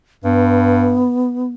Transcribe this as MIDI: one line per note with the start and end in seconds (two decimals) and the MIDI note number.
0.24 1.08 43
0.24 1.55 59